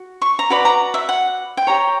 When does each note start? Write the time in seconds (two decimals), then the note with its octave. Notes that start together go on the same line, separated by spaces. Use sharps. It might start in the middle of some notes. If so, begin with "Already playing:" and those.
Already playing: F#4
0.22 C#6
0.39 A#5
0.50 F#4 B4 D5 B5
0.65 A#5
0.94 E5
1.09 F#5
1.57 G5
1.67 G4 C#5 A#5